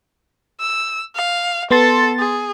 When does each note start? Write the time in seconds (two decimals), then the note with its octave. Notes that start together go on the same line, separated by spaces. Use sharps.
0.60 E6
1.15 F5
1.71 B3 A4 C6 A6
2.19 G#4